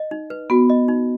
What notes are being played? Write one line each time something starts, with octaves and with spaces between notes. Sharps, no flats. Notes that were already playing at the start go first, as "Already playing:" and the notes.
Already playing: D#5
D#4
B4
B3 F#4
D#5
D#4